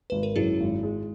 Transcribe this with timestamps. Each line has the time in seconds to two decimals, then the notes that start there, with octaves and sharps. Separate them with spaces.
0.10 G#1 B4
0.23 A#4
0.36 F#2 E4 G#4
0.60 G#1
0.83 G#3